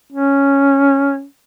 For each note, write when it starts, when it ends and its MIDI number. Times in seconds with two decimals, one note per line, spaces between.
0.12 1.24 61